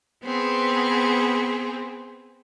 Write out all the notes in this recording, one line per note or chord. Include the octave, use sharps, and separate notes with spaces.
B3 C4 G#4